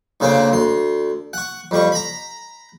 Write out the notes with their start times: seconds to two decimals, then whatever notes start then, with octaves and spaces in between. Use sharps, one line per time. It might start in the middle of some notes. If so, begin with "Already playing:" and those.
0.20 D2 C#3 A#3 C4
0.52 D2 C6
1.33 F#5 C#6
1.71 F2 G3 C#6
1.92 A#5 B5